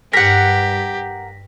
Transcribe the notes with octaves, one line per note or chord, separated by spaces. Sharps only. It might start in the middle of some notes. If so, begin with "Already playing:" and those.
G2 G4 A#4 F#5 A#6 B6